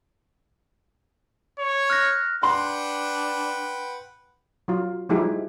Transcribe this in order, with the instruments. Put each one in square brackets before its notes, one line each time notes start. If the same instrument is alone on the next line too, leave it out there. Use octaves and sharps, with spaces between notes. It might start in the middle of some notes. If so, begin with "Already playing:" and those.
[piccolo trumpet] C#5
[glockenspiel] F6 F#6 A#6
[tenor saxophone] D4 [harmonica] B4 F#5 G5 [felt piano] C6
[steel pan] F#3 F4
F3 G3 G#3 D#4 E4 G4